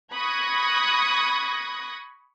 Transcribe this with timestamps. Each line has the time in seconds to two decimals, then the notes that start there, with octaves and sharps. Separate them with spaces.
0.14 B5 C#6 D#6 F#6 G#6 A#6